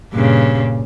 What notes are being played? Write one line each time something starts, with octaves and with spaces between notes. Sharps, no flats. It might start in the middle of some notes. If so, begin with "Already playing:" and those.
G2 A#2 C#3